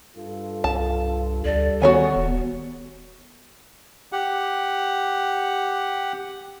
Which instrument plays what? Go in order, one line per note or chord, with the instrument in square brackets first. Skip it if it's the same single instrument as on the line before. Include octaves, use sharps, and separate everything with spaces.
[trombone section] G2 F4 A4
[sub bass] C2 [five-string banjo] A5
[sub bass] D2 [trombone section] G3 A4 [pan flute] D5
[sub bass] D#3 [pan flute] B3 [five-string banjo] F#4 C#5 G#5
[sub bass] D#1
[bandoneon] G4 F#5